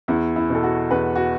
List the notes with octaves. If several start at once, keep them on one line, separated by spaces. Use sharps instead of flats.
E2 E4
E4
B2 A4
F#4
E2 B4
F#4